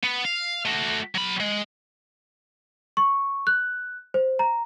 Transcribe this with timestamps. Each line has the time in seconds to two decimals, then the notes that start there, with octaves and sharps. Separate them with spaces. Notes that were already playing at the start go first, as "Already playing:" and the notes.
0.04 B3
0.25 F5
0.65 A3 F#4
1.15 F#3 B5
1.40 G#3
2.97 C#6
3.47 F#6
4.14 C5
4.39 A#5